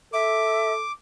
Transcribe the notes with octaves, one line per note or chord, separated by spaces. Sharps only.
A4 E5 D6